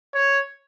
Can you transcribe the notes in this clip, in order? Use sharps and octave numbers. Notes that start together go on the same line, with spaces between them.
C#5